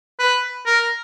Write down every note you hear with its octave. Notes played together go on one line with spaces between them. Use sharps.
B4
A#4